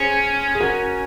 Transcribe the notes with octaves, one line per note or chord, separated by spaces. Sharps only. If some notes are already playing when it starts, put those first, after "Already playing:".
Already playing: C#4 G#4 C5
G#4
F#4 A#4